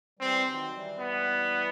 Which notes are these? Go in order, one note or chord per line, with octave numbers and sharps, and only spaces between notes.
E3 G3 C4
D#3 F#3
E3 G3
B3